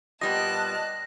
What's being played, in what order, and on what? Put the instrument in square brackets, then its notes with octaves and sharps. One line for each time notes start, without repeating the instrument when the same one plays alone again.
[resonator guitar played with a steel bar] A#2 G3 B3 [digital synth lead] D#5 [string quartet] A5 F#6 [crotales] A#6